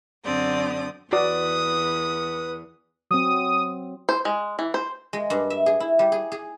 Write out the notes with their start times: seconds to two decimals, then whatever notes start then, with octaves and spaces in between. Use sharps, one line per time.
0.24 F#2 D3 C4 D5 D#6
1.13 E2 F#4 B4 D5 D#6
3.11 F#3 C4 D#6
4.09 C5
4.25 G#3
4.59 E3
4.74 C5
5.13 G#3
5.30 G2
5.50 E5
5.66 G#4
5.80 E4
5.99 G3
6.12 G#4
6.32 G#4